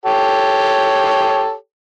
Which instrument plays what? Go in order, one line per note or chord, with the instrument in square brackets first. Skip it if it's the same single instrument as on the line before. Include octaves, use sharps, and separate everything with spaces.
[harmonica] G4 A4 C#5